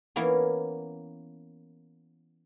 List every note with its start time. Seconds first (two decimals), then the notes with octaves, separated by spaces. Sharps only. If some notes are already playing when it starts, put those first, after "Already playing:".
0.16 E3 A#3 B3 C#4